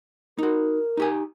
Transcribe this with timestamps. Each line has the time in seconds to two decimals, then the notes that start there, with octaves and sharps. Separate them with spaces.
0.38 D#4 F#4 A#4
0.97 D#4 G4 G#5